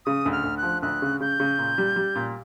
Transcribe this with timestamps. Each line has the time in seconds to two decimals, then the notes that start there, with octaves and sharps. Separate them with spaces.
0.05 C#3 D#6
0.26 D2
0.32 F6
0.44 D2
0.57 F#6
0.63 F3
0.82 D2 F#6
1.02 C#3
1.20 C#3 G6
1.40 C#3
1.59 A#2
1.78 G3
1.96 G3
2.15 A#2